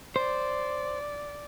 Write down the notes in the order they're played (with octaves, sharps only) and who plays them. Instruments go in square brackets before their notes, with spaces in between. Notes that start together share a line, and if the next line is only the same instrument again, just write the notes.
[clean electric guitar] C5 [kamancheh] D5